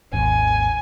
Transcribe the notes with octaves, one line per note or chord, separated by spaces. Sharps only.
G#1 D#2 G#5